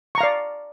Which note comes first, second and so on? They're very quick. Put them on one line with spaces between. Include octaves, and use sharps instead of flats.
C#6 A#5 F5 D5